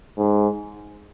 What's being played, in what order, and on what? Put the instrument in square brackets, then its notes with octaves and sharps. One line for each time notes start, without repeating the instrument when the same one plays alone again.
[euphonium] G#2